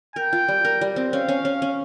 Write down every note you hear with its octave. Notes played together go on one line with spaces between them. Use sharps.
A#4 G5
F4
G3
A#4
G3
C4
C#4 F5
C#4
C#4
C#4